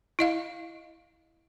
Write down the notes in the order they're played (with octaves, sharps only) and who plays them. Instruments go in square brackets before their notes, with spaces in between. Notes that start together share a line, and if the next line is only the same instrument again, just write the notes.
[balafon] E4 D#5 F5